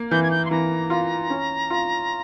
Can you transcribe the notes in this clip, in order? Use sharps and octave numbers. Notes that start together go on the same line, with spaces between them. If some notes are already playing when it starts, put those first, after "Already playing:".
Already playing: A#3
E3 G6
G#6
G6
C6
E3 A#5
F4
C#4
F4